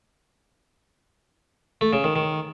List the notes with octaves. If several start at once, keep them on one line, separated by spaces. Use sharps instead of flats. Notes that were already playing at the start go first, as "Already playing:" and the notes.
A3
C#3
D#3
D#3